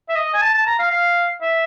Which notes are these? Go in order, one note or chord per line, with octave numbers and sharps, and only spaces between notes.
E5
D#5
G#5
A5
A5
A#5
F5
F5
E5